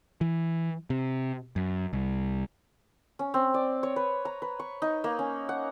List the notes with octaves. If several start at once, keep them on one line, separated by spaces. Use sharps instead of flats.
E3
C3
F#2
C2
C#4
C4
D5
C#5
B4
A#5
B4
C#6
D#4
A#3
C#4
F#5